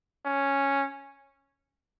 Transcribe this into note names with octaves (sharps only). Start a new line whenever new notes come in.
C#4